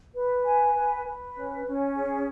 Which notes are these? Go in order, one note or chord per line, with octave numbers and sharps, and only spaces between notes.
B4
G#5
B4
B4
C#4
C#4
G#4